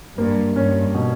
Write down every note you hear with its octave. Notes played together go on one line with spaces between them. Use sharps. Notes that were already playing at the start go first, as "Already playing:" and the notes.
G2 A#3
G2 C#4
B2